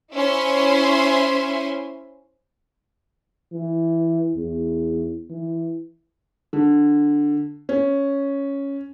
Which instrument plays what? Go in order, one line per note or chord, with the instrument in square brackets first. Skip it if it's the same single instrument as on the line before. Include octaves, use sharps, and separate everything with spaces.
[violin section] C#4 E4 C5 E5 G#5 C6
[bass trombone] E3
E2
E3
[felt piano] D3
C#4